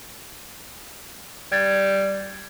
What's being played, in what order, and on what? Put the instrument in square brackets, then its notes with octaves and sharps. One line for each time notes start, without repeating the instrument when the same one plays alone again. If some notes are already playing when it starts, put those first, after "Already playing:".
[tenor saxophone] G3 [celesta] G#6 A6